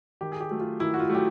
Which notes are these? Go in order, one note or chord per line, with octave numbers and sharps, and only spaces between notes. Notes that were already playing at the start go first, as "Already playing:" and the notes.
D#3 G4
G#4
G4
F#3 A3
F4
D#3 E4
F#4
F4
F#3 A3 G4